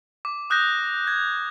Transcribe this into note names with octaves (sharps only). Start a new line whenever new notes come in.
D6
D#6 F#6 G6 A#6
G#6